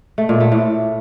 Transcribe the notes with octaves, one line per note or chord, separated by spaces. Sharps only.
A3
A#2
A3
A2